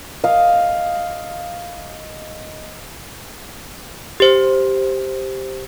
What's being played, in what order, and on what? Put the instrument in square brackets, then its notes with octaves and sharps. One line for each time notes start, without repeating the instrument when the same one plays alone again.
[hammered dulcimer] D#5 F5
[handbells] G4 C5